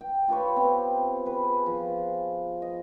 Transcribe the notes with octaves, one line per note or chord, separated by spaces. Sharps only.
G5
F4 G4 B4 C#5
B3 C4
G#4 B4
F3
D#5